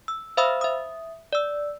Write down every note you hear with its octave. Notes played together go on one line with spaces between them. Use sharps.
E6
C5 E5 F5 B5 D#6 E6
E5 D#6
D5 E6